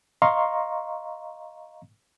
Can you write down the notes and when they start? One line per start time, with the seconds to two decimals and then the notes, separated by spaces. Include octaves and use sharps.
0.22 D#5 F5 A#5 C6 C#6